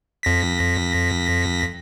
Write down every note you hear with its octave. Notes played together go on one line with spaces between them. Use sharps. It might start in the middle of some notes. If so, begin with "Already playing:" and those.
F2 A#6 B6